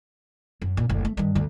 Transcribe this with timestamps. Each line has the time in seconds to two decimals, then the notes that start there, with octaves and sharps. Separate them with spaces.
0.62 F#2
0.77 A#2 C#3
0.89 F#1 D2
1.05 A3
1.17 G2 D#3
1.35 D2 D3